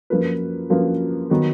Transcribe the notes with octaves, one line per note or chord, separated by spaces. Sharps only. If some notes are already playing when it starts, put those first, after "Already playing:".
F#2 F3 A#3 F4 B4
F#2 F3 A#3 F4 B4
D#3 F#3 B3